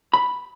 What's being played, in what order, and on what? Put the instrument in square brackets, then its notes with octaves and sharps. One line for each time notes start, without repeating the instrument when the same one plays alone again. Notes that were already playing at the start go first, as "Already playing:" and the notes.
[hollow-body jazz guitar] B5